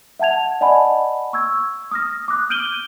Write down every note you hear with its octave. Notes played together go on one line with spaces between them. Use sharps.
E5 F#5 A5 G#6 F7
D5 D#5 F#5 G#5 A5 B5
C#6 E6 G#6
D#6 F6 A#6
D6 D#6 F#6
F6 G6 D7 D#7 F#7 G7